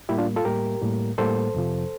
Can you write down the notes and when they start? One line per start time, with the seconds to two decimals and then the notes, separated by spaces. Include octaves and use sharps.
0.09 A2 G3 A#3 E4 G4
0.18 D4 F4
0.36 F4 A4
0.45 A2 G3 A#3 G4 A#4
0.82 A2 G3 A#3
1.18 A2 G3 A#3 A4 C5
1.54 F2 C3 F3